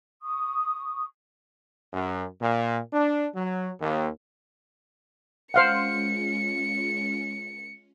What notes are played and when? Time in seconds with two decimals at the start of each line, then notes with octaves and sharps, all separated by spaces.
0.22 C#6 D#6
1.93 F#2
2.41 A#2
2.93 D4
3.36 F#3
3.81 D#2
5.54 G#3 C#4 F4 C5 F5 F#5 C#7